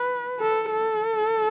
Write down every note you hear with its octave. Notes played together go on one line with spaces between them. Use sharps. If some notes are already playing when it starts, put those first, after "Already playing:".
Already playing: B4
A4
A4